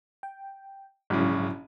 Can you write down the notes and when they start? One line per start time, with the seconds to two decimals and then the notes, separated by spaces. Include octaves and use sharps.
0.23 G5
1.10 A#1 G#2 C#3 F#3 E4